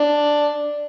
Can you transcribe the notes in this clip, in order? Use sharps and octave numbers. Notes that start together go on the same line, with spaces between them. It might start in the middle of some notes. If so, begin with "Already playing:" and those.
Already playing: D4